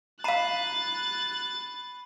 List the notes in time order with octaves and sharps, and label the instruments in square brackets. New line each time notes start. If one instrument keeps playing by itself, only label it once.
[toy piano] F5 A#5 [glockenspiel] B5 C7 D#7 [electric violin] F#6 A6